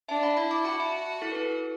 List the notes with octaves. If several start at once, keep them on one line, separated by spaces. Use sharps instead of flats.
D4 E5 A5
F#5 B5
E4 F#5 B5
A5 D6
F#4 F#5 B5
E5 A5
E4 A4
B4
E4 A4